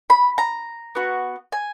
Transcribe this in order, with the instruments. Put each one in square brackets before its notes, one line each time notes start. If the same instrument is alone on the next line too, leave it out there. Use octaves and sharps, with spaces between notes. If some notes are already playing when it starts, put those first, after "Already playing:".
[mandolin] B5
A#5
B3 F#4
G#5